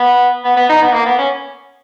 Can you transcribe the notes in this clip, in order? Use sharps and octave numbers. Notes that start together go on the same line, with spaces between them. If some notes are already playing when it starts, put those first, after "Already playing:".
Already playing: B3
B3
B3
D#4
B3
A#3
B3
C#4